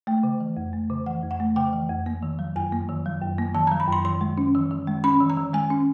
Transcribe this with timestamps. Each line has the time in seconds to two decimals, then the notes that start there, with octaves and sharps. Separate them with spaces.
0.07 A3 G5
0.23 C#3
0.40 E3
0.57 F2
0.73 A3
0.90 C#3
1.06 E3 F#5
1.23 F2
1.31 F#5
1.40 A3
1.56 C#3 G5
1.73 E3
1.90 F2
2.06 A#3
2.23 D#3
2.39 F#3
2.56 F#2 G#5
2.72 A#3
2.89 D#3
3.06 F#3
3.22 F#2
3.38 A#3
3.55 D#3 A5
3.67 F#3 A#5
3.80 B5
3.88 F#2 C6
4.05 D#3 C6
4.21 G#3
4.38 C#4
4.55 D#3
4.71 D#3
4.87 G#3
5.04 C#4 B5
5.20 D#3
5.30 A#5
5.37 D#3
5.53 G#3 G#5
5.70 C#4